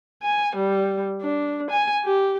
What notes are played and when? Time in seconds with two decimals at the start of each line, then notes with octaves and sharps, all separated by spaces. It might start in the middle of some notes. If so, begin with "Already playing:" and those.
0.22 G#5
0.56 G3
1.21 D4
1.71 G#5
2.04 G4